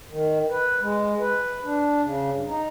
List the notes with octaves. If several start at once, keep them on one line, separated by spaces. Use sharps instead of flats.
D#3
B4
G#3
B4
D4
C#3
G2
D#4